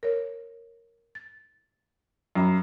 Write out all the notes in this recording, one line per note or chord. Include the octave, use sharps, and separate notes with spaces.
A#4 C#5
A6
F#2 G5 A#5 B5